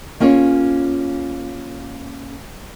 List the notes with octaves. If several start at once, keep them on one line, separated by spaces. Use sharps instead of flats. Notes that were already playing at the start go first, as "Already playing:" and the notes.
A#3 C#4 F4 G#4 C#5